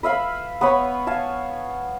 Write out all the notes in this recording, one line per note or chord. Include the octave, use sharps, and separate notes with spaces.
B4 E5 F5 B5
B3 B4 C#5 B5
F5 G#5 A5